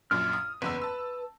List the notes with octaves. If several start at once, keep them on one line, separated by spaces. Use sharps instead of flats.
A#1 F#2 A#2 F6
D#6
F#1 E2 B4 E6
A5 E6